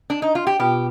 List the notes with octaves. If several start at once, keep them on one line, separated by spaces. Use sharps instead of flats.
D4
D#4
F4
G4
B2 B3 F4 G4